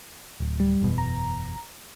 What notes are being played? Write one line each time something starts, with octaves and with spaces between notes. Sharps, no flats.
D1
G3
F#1 E2 B2
A#5